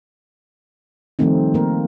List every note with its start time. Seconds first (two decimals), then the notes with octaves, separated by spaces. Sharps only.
1.19 D#3 F3 G3 A3 C4 D#4
1.54 A#3 A#4